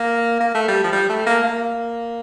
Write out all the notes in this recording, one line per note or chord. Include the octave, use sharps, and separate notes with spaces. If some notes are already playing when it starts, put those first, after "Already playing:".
Already playing: A#3
A#3
A3
G3
F3
G3
A3
A#3
A#3